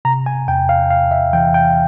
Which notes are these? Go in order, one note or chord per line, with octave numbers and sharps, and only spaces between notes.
C3 A#5
G#5
E2 G5
F5
E2 F5
E5
E3 G5
G5